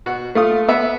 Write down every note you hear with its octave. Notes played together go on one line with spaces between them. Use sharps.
B2 F#4
A3 F4 D#6
B3 E5